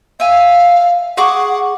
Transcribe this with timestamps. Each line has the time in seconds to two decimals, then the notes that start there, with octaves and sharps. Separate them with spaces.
0.20 E5 F5 G#5
1.17 G#4 F#5 C#6 D6